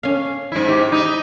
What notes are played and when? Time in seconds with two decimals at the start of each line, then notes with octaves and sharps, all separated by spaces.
0.03 C#4 F5
0.52 G#2 E4
0.68 G4
0.92 D#4 E4